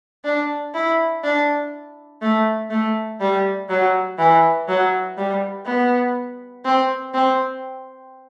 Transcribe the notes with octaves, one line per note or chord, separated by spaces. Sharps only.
D4
E4
D4
A3
A3
G3
F#3
E3
F#3
G3
B3
C4
C4